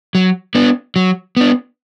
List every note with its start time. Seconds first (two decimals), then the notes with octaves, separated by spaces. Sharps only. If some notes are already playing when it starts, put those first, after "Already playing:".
0.15 F#3
0.55 B3 D4
0.96 F#3
1.37 B3 D4